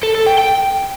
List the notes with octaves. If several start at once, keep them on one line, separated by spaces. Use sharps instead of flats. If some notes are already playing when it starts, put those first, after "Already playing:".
A4
A4
G5
G5